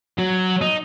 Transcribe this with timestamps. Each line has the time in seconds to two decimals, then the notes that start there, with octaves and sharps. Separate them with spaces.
0.18 F#3
0.61 D#4